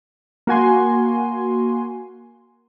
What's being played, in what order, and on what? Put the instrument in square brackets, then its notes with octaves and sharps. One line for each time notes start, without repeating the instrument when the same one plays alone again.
[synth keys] A#3 F#4 G#5 C6